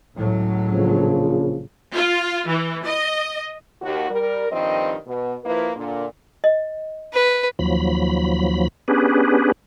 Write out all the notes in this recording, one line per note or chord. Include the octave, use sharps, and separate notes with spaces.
C#2 A2 F#3
A#1 C#3 F3
F4
E3
D#5
D#2 F#4
G3 A#4
G2 D#3 F3 C4 D#5
B2
F3 A#3 E4 B4
A#2 D3
D#5
B4
D#2 F3 F#3 B5
B3 C#4 D4 G4 G#4 B4